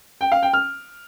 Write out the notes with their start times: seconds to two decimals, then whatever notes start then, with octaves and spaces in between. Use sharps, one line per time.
0.21 G5
0.32 F5
0.42 G5
0.53 F6